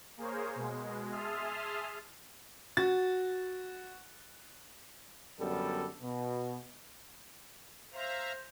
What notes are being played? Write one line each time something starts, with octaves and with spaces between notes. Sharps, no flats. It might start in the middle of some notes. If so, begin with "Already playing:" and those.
A#3 G#4 A#4 C5 C#5
B2 G#3
G#4 E5 A5 C6 D#6 F6
F#4 A6
F#2 D3 G3 B3 A4
B2
C5 E5 F5 A#5